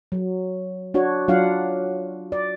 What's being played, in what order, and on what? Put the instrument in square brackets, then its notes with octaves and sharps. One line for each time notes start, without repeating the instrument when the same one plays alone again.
[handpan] F#3
D4 F#4 C#5
F#3 D4 F4 F5 F#5
D5